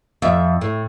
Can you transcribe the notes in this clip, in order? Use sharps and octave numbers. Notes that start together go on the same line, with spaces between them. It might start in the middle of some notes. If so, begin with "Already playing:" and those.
F2 E5
A2